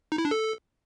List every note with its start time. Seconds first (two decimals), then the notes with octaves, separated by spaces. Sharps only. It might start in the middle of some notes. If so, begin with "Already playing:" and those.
0.12 D#4
0.18 E4
0.25 D4
0.31 A4